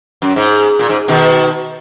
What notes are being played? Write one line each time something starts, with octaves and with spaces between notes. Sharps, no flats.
F#2
G#2
A#2
G#2
B2 D#3